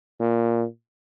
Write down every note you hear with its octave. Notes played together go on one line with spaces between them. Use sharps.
A#2